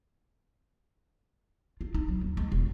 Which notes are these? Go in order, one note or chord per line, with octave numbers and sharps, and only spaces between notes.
F4
D#4
F#3
D#2
G#3
E1